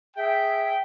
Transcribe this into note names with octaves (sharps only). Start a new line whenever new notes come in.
G#4 E5 G5